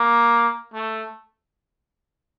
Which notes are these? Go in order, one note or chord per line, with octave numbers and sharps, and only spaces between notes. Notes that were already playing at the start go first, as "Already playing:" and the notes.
Already playing: A#3
A3